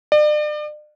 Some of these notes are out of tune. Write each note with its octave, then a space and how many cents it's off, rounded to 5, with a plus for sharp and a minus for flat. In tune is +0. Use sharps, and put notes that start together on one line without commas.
D5 +40